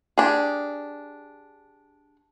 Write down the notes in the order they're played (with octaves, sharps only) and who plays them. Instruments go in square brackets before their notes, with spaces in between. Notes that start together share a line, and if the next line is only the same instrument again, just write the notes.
[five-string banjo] D4 G4 G#4